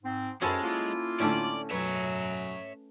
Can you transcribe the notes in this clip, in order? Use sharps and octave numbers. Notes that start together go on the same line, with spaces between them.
G#2 C4
F#2 G#3 C#4 F#4 A4 C5 B5
A#3 E4 F4
A2 D3 A3 C#4 D5
F#2 B2 F#3 B4 C#5 E5